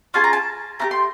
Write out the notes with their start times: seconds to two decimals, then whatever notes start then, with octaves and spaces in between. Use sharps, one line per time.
0.14 C#4 F4 G#4 A5
0.24 A#5
0.33 A5
0.79 A3 D4 G4 A#5
0.91 C6